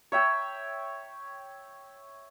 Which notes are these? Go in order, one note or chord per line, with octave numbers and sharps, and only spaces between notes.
C#5 E5 G5